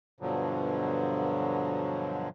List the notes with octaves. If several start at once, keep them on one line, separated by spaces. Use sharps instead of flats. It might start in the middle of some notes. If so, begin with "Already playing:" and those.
G2 B2 D3 F3 F#3